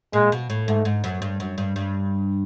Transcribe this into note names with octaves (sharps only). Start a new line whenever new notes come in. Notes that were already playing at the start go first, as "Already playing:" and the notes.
A#2 G#3
B2
A2
G#2 A3
G#2
F#2
G2
F#2
G2
G2